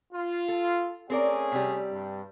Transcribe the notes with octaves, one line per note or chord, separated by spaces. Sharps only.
F4
A4
A3 C4 C#4 G#4 A#4 D5
C3 G3
G2